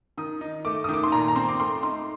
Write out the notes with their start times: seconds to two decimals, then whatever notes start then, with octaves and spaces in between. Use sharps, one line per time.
0.17 D#3 D#6
0.41 D#4
0.65 A3 D6
0.84 D#3 D#6
0.94 D6
1.04 C6
1.12 A#2 A#5
1.28 A#5
1.36 C4 C6
1.49 D6
1.60 A3 C6
1.83 D#4 C6